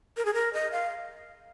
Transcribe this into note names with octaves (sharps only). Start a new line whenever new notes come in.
A#4
G#4
A#4
D#5
F5